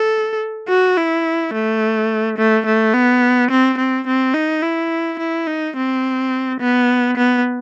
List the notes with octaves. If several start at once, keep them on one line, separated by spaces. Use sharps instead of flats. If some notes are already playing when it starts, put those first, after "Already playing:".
Already playing: A4
F#4
E4
A3
A3
A3
B3
C4
C4
C4
D#4
E4
E4
D#4
C4
B3
B3